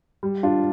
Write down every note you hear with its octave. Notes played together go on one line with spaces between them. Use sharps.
G3
D4 F4